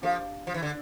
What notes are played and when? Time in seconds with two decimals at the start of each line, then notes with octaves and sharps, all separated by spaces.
0.02 F3 D4 G4 A#4 F5
0.47 F3
0.54 E3
0.63 D3